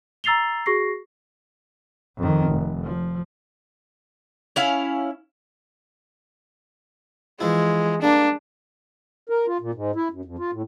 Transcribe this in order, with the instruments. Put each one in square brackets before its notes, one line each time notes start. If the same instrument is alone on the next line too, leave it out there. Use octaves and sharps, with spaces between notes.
[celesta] A#5 E6 A6 C7 F7 G7
F#4 G#4 C#6 A#6 C7
[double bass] F2 D#3
F1
F3
[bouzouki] C#4 E4 F5
[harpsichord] E3 F3 E4 [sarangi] G#3
[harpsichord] G3 A#3 [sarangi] D4
[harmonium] A#4
F4
A#2
G#2
E4
F#2
F2
F4
A2